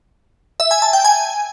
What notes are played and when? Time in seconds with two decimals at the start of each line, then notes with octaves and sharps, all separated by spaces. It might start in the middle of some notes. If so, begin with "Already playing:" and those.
0.60 E5
0.71 G#5
0.82 A5
0.93 G5
1.04 G#5